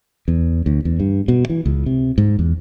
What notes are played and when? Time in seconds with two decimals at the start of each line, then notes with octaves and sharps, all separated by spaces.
0.28 E2
0.66 D2
0.85 E2
1.00 G2
1.28 B2
1.50 E3
1.66 C#2
1.86 C3
2.18 G#2
2.39 E2